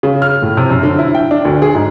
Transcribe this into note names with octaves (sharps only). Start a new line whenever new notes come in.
C#3
F6
A2
C3
F#2
D3
E4
G5
D4
D2
G#4
G#2